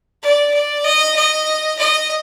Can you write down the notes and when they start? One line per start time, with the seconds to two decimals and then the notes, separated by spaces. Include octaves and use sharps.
0.22 D5
0.54 D5
0.84 D#5
1.16 D#5
1.78 D#5